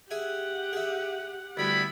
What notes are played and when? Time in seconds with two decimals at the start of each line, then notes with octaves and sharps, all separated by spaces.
0.11 G4 G#4 E5 F#5 G#5
0.73 G#4 E5
1.57 D2 G3 B3 E4 B5